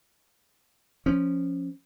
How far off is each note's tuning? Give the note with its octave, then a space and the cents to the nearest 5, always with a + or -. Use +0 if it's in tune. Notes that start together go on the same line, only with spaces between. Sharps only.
F3 +0 C#4 +0